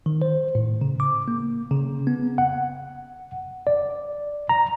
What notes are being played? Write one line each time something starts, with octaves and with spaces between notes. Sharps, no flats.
D#3
C5
A2
C#3
D6
A#3
C#3
B3
F#5
D5
A#5